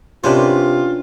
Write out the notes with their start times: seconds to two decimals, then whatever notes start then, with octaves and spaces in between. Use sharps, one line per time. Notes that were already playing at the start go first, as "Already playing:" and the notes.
0.24 C3 C#4 D4 F4 B4 C5